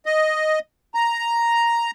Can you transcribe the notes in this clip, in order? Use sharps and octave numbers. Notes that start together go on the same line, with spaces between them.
D#5
A#5